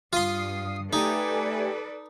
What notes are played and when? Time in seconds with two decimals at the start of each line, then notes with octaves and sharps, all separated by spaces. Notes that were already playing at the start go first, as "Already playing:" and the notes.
0.13 G2 F4 C6 D#6 C7
0.93 A3 D#4 G4 A4 B4 D5 G#5